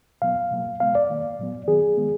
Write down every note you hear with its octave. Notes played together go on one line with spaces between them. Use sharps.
B2 F#3 B3 F5
B2 F#3 A#3
B2 G#3 B3 F5
D5
D#3 A#3
A#2 F#3 B3
D#3 F#3 B3 G#4
D#3 G#3 B3